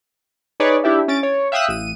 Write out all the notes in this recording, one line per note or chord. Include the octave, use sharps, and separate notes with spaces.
D#4 G#4 B4 C#5 D5
D4 E4 G4 E5
C#4 A6 D7
C#5
E5 F5 G5 D#6 E6 F#6
A1 D#7